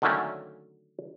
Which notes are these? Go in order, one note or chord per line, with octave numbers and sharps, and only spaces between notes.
D3 D#3 F#3 A3 A#3 C#4